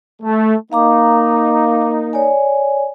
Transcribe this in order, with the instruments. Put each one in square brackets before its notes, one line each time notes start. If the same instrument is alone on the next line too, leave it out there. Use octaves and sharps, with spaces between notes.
[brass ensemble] A3
[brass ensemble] A#3 D#4 [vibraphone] F5 A#5 D6
[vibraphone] C#5 D5 G#5